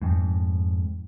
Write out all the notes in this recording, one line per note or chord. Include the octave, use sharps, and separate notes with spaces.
F2 G#2